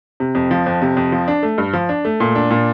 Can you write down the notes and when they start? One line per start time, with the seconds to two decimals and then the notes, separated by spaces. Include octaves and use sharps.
0.20 C3
0.35 F2
0.51 F3
0.66 F2
0.82 C3
0.97 F2
1.12 F3
1.28 D4
1.43 A3
1.58 G2
1.73 F3
1.89 D4
2.05 A3
2.20 A#2
2.35 D4
2.51 A#2